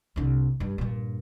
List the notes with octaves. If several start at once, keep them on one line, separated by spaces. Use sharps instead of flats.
C2 D3
G2
G2 A#2